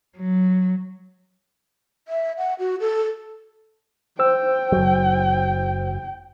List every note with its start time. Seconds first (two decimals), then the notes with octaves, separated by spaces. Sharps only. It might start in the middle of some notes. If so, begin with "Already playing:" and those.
0.17 F#3
2.08 E5
2.37 F#5
2.59 F#4
2.80 A4
4.19 C5 G5 E6
4.72 F#1 F#3